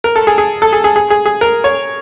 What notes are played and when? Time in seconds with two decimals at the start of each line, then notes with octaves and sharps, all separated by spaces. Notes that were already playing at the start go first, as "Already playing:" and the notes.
0.04 A#4
0.16 A4
0.27 G#4
0.38 G#4
0.62 A4
0.73 G#4
0.84 G#4
0.96 G#4
1.10 G#4
1.26 G#4
1.41 A#4
1.64 C#5